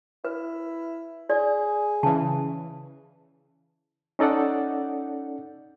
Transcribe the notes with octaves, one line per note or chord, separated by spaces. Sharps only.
E4 B4
G#4 D5
C#3 E3 A5
C#4 D#4 A4 D5 F#5